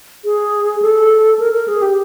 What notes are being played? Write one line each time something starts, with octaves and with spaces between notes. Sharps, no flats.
G#4
A4
A#4
A#4
G#4
G4